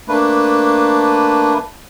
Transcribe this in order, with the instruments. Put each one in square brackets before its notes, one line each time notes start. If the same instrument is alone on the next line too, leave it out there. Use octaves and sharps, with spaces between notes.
[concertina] A3 A#3 D4 B4